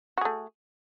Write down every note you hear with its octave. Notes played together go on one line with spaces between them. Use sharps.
A3 F#4 G#4